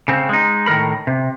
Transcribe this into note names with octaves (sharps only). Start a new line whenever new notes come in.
C#3 C4
G#3 D#4
A2 D#3 G#3 A#4 B5
C3